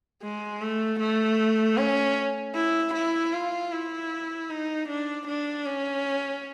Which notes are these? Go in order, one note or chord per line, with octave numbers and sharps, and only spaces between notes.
G#3
A3
A3
C#4
E4
E4
F4
E4
D#4
D4
D4
C#4